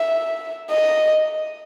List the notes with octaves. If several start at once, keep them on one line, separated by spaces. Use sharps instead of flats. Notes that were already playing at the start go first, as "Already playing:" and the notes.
Already playing: E5
D#5